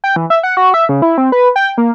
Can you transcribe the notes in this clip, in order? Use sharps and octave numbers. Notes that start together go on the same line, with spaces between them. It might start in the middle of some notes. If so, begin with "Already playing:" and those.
G5
E3
E5
F#5
F#4
E5
C#3
E4
C4
B4
G5
A#3